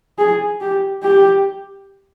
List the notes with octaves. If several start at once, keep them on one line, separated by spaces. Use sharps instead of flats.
G#4
G4
G4